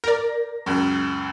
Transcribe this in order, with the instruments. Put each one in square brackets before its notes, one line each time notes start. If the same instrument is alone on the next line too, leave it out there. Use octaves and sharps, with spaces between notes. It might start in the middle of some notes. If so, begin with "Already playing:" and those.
[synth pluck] A#4 D5 [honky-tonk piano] A#6
[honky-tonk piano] C#2 F#2